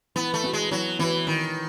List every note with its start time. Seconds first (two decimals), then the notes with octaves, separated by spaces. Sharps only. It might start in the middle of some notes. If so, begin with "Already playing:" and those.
0.16 E3 B3
0.34 A3
0.44 B3 F#4
0.53 G#3
0.71 E3 F#3
0.99 E3 B3 F#4
1.27 D#3 E3